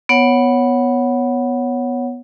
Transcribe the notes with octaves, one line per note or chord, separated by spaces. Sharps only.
B3 C#5 F#5